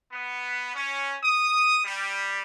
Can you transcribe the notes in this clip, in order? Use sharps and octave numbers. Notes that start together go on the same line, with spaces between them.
B3
C#4
D#6
G3